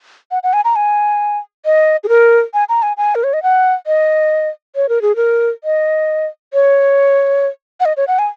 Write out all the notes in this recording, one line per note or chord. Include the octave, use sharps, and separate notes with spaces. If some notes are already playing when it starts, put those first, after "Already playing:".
F#5
F#5
G#5
A#5
G#5
D#5
G#4
A#4
G#5
A#5
G#5
G#5
A#4
C#5
D#5
F#5
D#5
C#5
A#4
G#4
A#4
D#5
C#5
F#5
D#5
C#5
F#5
G#5